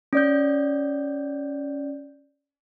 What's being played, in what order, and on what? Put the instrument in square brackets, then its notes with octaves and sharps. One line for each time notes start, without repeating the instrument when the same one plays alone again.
[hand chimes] C#4 D5 G6